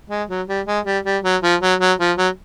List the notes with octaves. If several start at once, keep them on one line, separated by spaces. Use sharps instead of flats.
G#3
F#3
G3
G#3
G3
G3
F#3
F3
F#3
F#3
F3
F#3